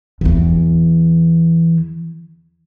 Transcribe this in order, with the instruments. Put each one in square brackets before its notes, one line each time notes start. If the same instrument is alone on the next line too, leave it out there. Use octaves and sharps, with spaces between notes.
[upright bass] E2 E3